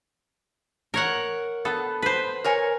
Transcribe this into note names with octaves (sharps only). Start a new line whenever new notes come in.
A#4 C#5 F#5
B3 A4
B4 C5
A#4 C#5 G#5